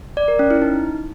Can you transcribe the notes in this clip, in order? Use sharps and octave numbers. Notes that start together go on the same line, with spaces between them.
D5
A#4
C#4
E4
D#4